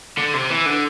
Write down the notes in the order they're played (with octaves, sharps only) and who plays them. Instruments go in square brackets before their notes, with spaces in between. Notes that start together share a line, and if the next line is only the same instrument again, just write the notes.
[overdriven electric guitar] D3
C3
E3
D3